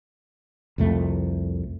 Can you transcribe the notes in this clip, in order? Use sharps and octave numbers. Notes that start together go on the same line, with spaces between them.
C2 F2 A3